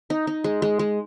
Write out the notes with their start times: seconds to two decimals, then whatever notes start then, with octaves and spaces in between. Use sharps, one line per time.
0.10 D#4
0.27 D#4
0.44 G#3
0.62 G#3
0.79 G#3